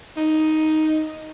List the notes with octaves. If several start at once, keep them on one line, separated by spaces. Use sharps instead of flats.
D#4